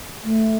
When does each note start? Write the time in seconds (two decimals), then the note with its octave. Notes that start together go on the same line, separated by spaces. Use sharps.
0.23 A3